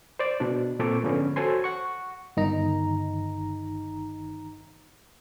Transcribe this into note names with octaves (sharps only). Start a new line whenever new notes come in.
C5 D5
B2 D4
A#2 C4 A4 C#6 D6
G#2 D3 F3 B3 C#4
F#4 A4 C5 C#5 G#5 C6
F#5 C#6
G1 D#3 D#4 A#5